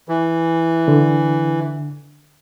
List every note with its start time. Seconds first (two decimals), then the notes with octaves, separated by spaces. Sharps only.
0.09 E3
0.88 D3